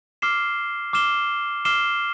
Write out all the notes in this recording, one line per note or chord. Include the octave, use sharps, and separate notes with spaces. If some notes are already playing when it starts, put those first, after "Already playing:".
D6 F6 C7 E7 G7
D6 F6 C7 E7 G7
D6 F6 C7 E7 G7